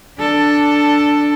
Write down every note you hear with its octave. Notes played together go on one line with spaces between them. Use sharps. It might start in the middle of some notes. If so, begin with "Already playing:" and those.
D4 A4